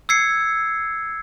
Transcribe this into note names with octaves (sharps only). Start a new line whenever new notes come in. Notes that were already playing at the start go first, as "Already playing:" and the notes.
E6 G#6 C7 C#7